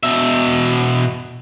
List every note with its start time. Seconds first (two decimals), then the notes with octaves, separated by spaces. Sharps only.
0.03 B2 E5